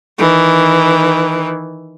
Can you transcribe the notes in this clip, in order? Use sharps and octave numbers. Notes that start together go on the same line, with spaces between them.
D#3 E3